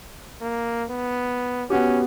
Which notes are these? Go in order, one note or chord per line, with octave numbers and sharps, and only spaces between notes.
A#3
B3
B3 C#4 F#4 G4